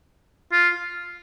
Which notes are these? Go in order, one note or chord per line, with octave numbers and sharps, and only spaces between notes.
F4